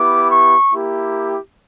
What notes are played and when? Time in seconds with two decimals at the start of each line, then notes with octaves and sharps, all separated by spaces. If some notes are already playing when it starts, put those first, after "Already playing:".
Already playing: B3 E4 G4 D6
0.31 C#6
0.73 A#3 E4 G4